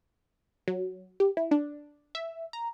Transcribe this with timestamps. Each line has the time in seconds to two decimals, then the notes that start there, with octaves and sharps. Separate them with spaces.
0.68 F#3
1.20 G4
1.37 E4
1.51 D4
2.15 E5
2.53 A#5